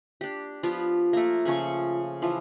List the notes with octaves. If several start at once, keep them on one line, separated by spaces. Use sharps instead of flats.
D4 G4
F3 B3 F4 G4
A3 A#3
C#3 F3 C#4 C#6
E3 F3